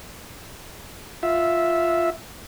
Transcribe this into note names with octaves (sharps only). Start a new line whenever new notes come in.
F4 E5